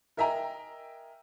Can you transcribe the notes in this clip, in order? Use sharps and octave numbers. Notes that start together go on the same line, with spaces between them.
A#4 D#5 E5 G5 G#5 A#5